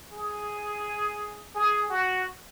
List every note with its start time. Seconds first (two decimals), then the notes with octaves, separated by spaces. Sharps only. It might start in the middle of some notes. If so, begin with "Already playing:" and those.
0.12 G#4
1.55 G#4
1.90 F#4